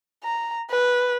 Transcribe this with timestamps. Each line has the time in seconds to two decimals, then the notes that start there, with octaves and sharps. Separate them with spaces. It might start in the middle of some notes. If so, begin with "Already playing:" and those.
0.24 A#5
0.71 B4